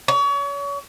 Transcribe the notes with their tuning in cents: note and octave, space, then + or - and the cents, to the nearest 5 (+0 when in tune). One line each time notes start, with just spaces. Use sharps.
C#5 +35